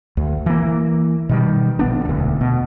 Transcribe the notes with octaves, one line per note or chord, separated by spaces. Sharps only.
D2
E3 A#3
B2 D#3 G3
A#1 B3 D4
E1 D2
B2